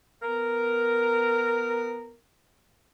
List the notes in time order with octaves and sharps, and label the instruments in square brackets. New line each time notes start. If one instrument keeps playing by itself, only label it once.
[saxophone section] B3 A#4